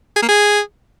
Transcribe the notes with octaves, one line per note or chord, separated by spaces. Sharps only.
G#4
A#3
G#4